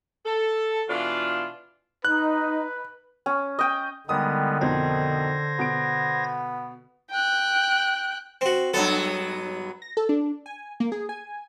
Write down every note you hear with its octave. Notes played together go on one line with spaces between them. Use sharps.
A4
B2 E3 D4 F4
D#4 B4 F#6
C#4
D#5 G5
D3 D#3 G3 G#3 B3 D#6
F2 B2 D#4 C5 G#6 A#6
B2 B3 D7
G5 F#6
C4 F#4
G2 F#3 B3 A4
A#6
A4
D4
G#5
A#3
G#4
G#5